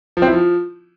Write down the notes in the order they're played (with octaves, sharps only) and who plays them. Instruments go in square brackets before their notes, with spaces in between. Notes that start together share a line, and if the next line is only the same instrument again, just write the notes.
[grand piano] F3
C4
E4
F3